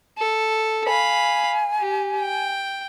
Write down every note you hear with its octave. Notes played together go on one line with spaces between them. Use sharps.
A4
F5 G#5 B5
G4
G5